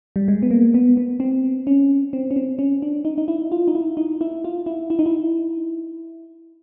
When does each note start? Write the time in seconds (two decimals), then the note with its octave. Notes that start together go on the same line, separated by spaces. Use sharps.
0.16 G3
0.28 G#3
0.42 B3
0.51 A#3
0.74 B3
0.97 B3
1.20 C4
1.67 C#4
2.13 C4
2.31 C#4
2.36 C4
2.59 C#4
2.82 D4
3.05 D#4
3.18 D#4
3.28 E4
3.52 F4
3.68 D#4
3.75 E4
3.97 D#4
4.21 E4
4.44 F4
4.66 E4
4.90 E4
4.99 D#4
5.06 E4